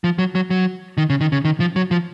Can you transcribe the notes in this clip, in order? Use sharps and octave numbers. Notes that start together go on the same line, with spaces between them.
F3
F#3
F#3
F#3
D#3
C#3
D#3
C#3
D#3
F3
F#3
F3